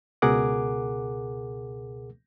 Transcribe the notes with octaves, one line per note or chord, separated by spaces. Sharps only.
C#2 B2 G#4 A#4 F#5 D6